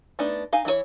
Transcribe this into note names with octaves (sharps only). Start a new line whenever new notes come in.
A3 B3 D4 D#4
D#4 F5 G#5
E3 E4 F#4 C#5